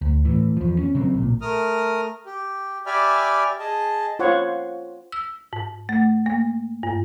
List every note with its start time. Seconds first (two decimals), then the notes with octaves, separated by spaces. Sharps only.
0.01 D2
0.25 A2 E3
0.57 E2 F3
0.79 C#4
0.95 C#3 F#3 C4
1.14 B1 A#2
1.41 A3 A#4 D#6 F6
2.26 G4
2.86 G4 D5 E5 G#5 B5 F6
3.59 G#4 D#5 A5
4.19 F4 C5 C#5 F#5
5.12 E6
5.53 G#2
5.89 A3
6.26 A#3
6.83 G2